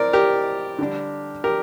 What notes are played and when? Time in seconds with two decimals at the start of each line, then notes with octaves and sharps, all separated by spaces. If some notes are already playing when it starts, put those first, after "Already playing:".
Already playing: C4 E4 A#4 D5
0.13 G4 A#4
0.79 D3 G3 D4
1.44 G4 A#4